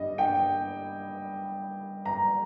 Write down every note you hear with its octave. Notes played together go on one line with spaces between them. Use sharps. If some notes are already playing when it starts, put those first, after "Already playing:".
Already playing: G2 G3 D#5
G5
A#5